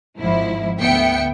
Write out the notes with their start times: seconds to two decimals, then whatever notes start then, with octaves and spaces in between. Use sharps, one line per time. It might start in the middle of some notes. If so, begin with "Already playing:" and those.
0.19 G#1 G#2 F3 E4
0.79 D2 B3 E5 G5 C#7